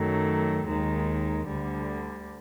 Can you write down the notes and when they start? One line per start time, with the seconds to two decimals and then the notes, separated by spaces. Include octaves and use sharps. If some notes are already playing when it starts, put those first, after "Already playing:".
Already playing: F#2 D#3 F#3 A3
0.66 D#2 D#3 G#3
1.47 D2 D3 G3